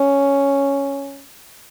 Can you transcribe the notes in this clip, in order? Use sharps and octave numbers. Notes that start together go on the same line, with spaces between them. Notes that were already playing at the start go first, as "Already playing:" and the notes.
Already playing: C#4